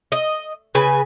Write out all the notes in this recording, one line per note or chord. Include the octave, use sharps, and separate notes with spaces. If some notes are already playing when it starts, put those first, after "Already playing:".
D#5
C#3 B4 G#5